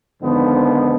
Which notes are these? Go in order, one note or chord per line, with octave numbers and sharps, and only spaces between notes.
F2 G#2 D3 D#3 F3 B3